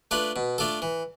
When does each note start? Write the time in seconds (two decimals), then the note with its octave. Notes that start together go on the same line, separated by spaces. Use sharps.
0.11 A3 D4 F4 B4
0.36 B2
0.58 A3 D4 F4 A4
0.82 E3